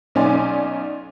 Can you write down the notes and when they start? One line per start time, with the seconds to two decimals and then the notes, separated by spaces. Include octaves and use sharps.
0.15 B1 C#4 D#4 D5 G#5 C6